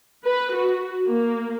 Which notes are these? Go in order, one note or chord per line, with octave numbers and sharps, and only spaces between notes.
B4
F#4
A#3